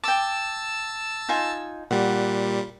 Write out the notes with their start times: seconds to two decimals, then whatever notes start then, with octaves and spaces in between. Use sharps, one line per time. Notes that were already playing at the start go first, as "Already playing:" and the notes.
0.04 G5 A5 D6 E6
1.29 D#4 F4 G#5
1.91 A#2 G3 F#5